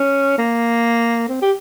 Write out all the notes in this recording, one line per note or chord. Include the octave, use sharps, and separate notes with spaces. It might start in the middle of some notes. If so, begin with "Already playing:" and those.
Already playing: C#4
A#3
C4
G4